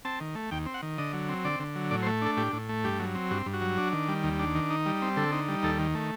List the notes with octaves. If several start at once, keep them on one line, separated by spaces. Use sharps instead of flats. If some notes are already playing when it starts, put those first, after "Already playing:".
C4 A5
D#3
A3
D#2 G5
C4
F#5
D#3
D3 D#5
F#3
C4
D3 D5
D3
F#3
A2 D5
C5
A3
D4 A4
A2 G4
A2
A3
G2 G4
F#3
C4
G2 F#4
G2
F#4
F#3
D4
D#3
G3
D#2
D4
D#3
D#4
G3
C4
D3 A4
D#4
G3
D#2 A4
D#3
A3